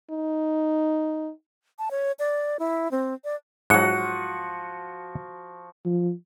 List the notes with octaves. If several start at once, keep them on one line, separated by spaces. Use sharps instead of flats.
D#4
A5
C#5
D5
E4
C4
D5
G#2 F3 F#3 F#4 F#6 C#7
F3